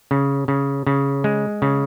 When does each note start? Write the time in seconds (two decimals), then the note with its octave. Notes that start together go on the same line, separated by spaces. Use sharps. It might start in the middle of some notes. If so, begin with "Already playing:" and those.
0.11 C#3
0.48 C#3
0.87 C#3
1.24 G#3
1.62 C#3